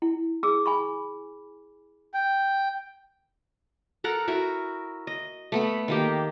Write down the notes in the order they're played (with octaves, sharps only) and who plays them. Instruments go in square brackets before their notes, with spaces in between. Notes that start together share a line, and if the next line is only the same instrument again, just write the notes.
[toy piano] E4
G#4 D6 E6
G#5 B5 C#6
[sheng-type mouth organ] G5
[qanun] A4 A#4 F#5
E4 F#4 A#4
D#5
A3 B3 B5
D#3 A#3 G4